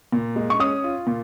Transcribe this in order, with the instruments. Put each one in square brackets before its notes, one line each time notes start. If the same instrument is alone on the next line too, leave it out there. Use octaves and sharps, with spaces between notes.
[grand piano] A#2
G#3
[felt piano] C#6
[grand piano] C#4 [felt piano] D#6
[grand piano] F4
A#2